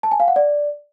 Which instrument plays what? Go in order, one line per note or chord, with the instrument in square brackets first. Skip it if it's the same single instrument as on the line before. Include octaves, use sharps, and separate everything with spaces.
[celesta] A5
G#5
F5
F#5
D5